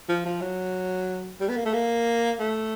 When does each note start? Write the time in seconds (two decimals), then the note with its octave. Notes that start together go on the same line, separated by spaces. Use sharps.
0.09 F3
0.26 F3
0.42 F#3
1.40 G3
1.49 B3
1.57 A#3
1.66 A3
1.74 A#3
2.40 A3